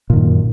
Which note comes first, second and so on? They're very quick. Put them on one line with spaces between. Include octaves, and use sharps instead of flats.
A#2 D#3 F#2